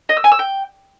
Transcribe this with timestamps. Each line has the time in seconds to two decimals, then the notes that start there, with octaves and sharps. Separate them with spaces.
0.09 D#5
0.17 E6
0.24 G#5
0.32 E6
0.39 G5